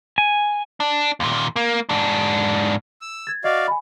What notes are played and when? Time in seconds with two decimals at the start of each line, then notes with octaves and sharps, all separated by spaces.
0.18 G#5
0.80 D4
1.20 D#2 A#2
1.56 A#3
1.89 G#2 D4
3.01 E6
3.27 G#6 A6
3.44 F#4 D5 D#5 F5
3.68 G#5 B5